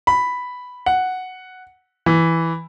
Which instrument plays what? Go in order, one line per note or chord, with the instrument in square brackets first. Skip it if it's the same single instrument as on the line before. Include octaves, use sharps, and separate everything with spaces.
[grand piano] B5
F#5
E3